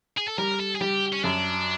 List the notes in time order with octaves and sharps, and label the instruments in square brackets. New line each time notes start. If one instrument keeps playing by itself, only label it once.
[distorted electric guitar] G#4
A4
[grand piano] G3 [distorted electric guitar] A#4
[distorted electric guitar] A4
G#4
[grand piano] G3 [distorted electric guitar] G4
[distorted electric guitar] C#4
[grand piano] F#2 [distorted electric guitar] D4